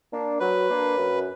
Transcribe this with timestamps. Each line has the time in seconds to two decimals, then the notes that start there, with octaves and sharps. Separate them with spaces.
0.12 A#3 D4
0.40 F#3 B4
0.68 A#3 D4
0.97 F#2